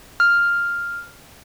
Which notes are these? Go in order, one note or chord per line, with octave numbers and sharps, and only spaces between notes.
F6